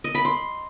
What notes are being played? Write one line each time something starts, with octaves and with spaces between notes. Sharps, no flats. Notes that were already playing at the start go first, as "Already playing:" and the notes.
D#5
B5
C6